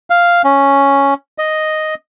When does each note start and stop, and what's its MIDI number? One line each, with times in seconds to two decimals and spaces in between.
0.10 0.42 77
0.44 1.14 61
1.38 1.95 75